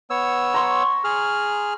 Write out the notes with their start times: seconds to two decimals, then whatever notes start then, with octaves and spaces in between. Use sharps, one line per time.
0.10 B3 C#5 E6
0.54 A#5 C6 C#6
1.04 G#4 F6